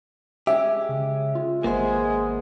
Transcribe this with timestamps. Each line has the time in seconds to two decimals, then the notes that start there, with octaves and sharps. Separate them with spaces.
0.47 G#3 C#4 G4 E5
0.89 C#3
1.35 F4
1.64 G#1 G#3 A#3 B3 C5